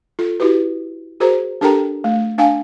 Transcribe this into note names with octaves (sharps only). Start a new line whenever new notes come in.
F4 A4
E4 F#4 G4 B4
F#4 G#4 A#4 C5 A#5
D4 G4 A4 A#4 G5 A#5
A3
D4 F5 G5 G#5